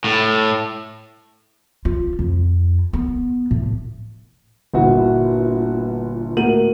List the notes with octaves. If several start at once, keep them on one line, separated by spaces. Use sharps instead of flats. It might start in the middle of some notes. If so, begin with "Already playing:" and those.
A2
F4
F2
B3
A2
G1 A#2 E4 F#4
A2 A#3 F#4 D#7 F#7